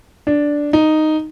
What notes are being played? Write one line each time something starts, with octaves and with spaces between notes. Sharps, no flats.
D4
D#4